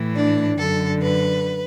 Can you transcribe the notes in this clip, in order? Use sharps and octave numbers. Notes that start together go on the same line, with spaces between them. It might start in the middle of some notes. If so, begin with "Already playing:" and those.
Already playing: A2 E3
D4
F#2 D3 A4
B4